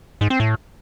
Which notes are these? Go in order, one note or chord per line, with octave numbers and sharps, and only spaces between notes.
G#2
C4
A2